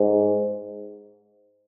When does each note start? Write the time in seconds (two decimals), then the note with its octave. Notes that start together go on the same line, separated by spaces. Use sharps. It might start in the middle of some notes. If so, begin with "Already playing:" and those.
Already playing: G#2